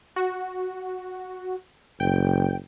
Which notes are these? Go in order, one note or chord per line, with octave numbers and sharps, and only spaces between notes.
F#4
F#1 G5